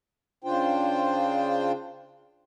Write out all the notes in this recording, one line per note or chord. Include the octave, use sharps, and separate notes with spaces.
C#3 D4 F4 C5 G5